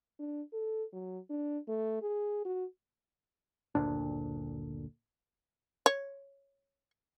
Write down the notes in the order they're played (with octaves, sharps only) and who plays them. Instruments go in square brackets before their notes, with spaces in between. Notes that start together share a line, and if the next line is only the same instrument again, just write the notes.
[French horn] D4
A4
F#3
D4
A3
G#4
F#4
[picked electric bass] F#1 D2 A#2 D4
[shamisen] C#5